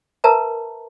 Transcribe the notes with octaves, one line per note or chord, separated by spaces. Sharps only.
A#4 B4 E5 A5 A#5